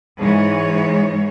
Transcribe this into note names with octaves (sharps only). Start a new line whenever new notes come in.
G#2 E3 G#3 C#5